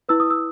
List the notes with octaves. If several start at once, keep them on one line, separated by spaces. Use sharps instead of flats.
E4 B4 E6
D#6
E6